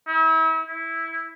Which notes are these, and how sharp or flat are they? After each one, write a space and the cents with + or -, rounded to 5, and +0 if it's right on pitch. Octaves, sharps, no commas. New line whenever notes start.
E4 -40
E4 -10